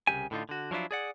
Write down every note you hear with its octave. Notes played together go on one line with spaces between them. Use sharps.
C2 C#3 A3 G4 G#5
A2 D3 D#4 F4
D3 F#4
F3 F#3 D4 E4 F4
G#4 D5 F#5